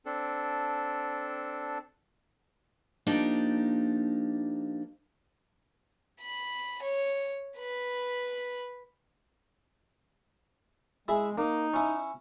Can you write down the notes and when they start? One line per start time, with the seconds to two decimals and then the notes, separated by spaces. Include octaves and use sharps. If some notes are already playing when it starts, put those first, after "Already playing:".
0.06 C4 D4 A4
3.07 F3 A#3 D4 D#4 G4
6.20 B5
6.82 C#5
7.57 B4 B5
11.08 G#3 E4 G#4 E5
11.38 A#3 D#4
11.74 C#4 E4